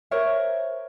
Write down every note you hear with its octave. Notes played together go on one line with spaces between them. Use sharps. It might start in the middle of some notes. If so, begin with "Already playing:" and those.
A#4 C5 C#5 E5